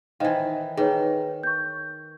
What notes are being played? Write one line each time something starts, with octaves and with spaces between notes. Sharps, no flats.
D#3 E3 C5 D#5 F5
D#3 G#4 B4 C#5
C#6 G6